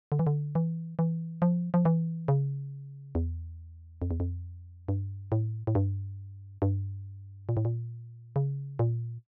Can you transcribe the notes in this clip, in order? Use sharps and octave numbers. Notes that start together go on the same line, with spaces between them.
D3
E3
D3
E3
E3
F3
F3
E3
C#3
E2
F2
E2
F2
G2
A2
A2
G2
G2
A#2
A2
A#2
C#3
A#2